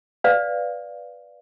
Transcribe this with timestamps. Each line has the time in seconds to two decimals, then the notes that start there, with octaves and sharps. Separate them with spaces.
0.24 B4 D5 F5